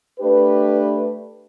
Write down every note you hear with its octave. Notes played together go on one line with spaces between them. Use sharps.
A3 D4 G4 B4